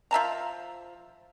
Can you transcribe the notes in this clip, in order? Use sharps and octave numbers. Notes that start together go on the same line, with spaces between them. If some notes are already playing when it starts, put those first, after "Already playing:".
F3 E5 A5 A#5